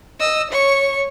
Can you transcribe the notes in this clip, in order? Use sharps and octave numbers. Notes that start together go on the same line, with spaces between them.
D#5 E6
C#5 C#6